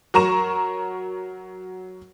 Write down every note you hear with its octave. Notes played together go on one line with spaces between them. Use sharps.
F#3 A#4 A#5 C#6 E7